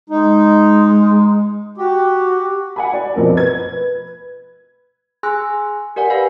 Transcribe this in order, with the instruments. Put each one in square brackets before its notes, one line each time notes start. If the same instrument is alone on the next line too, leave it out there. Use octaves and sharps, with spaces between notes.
[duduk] G#3 [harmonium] D#4
[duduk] F#4 [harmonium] G4
[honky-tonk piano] F#5 G#5 B5
D5
B2 F3 C4 A#4
B4 G#6
[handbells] G#4 G#5 C6 E6 F#6 A#6
G4 A#4 D5 F#5 G#5
B4 D5 F5 B5